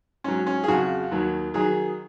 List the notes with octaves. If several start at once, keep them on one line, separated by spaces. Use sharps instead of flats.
G#2 F#3 C#4
C#4
G#4
F2 C#3 F#3 F#4
D#2 D#3 F#3
D#3 F#3 G#4